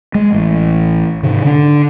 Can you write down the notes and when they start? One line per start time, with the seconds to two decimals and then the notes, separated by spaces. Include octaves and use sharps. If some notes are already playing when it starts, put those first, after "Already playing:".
0.15 G#3
0.33 A1
1.23 G#2 C3 D#3
1.44 D3 D4